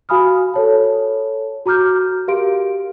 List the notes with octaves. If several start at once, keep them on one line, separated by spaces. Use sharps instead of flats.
F#4 F5 G#5 B5 D#6 F6
A4 C#5 A5
F#4 A#5 D6 F6 G6
G4 A#4 F5 C6 D7